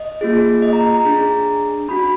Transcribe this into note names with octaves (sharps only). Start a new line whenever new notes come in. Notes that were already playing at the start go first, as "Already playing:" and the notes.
Already playing: D#5
A#3 F4 G#4
D#5
A#5
A#5
A#5
D4 G#4
D4 F#4 B5
B5